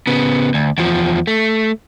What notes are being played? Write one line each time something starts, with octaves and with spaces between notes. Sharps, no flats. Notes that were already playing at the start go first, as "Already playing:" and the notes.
C#3 B3
D2
E2 F3
A3